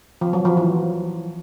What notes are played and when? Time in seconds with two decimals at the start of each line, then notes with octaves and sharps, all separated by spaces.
0.21 F3
0.33 F#3
0.45 F3
0.57 E3